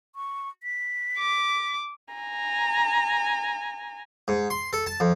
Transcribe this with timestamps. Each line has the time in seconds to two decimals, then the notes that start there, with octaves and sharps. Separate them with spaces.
0.16 C#6
0.63 B6
1.18 D6
2.14 G#5 A#5
4.28 G#2
4.50 C6
4.73 A4
4.86 A5
5.00 F2